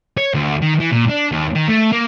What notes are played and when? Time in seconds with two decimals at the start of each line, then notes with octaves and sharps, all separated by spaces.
0.17 C#5
0.34 D2
0.62 D#3
0.80 E3
0.92 A#2
1.09 D4
1.32 D#2
1.55 D#3
1.68 A3
1.92 A#3